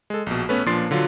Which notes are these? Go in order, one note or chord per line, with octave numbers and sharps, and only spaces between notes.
G#3 A4
A#1 B2
A3 B3 C#4 A4 B4
A#2 F3 D4 C6 A6 C7
D3 F#3 F4